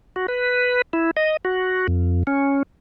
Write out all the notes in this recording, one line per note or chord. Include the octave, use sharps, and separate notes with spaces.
F#4
B4
E4
D#5
F#4
F2
C#4